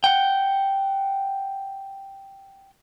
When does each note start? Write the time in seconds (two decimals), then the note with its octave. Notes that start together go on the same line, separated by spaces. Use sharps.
0.04 F#5 G5